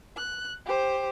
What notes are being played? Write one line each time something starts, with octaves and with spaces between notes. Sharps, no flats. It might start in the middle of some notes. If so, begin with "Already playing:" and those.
F#6
G4 C5